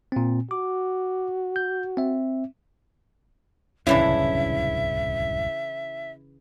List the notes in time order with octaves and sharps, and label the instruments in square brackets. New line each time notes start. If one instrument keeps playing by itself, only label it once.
[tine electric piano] A#2 C4
[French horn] F#4 [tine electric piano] D6
[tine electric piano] G6
C4 E5
[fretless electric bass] D1 C2 F#2 [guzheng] C#3 E3 D4 [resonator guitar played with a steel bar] E4 [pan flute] E5